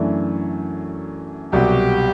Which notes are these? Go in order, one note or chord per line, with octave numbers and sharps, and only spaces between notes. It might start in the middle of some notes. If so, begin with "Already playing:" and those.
Already playing: F#2 E3 A3 D4
C2 B2 F#3 G4